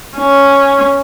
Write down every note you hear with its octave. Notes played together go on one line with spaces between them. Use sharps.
C#4